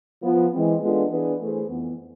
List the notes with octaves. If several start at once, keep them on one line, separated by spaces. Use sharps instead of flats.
F3 B3 F4
E3 G#3 C4
G#3 B3 D4 F4 A4
E3 B3 D4 G#4 B4
E3 A3 E4 G#4 C5
F2 E3 B3